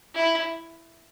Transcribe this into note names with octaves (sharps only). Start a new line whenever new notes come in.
E4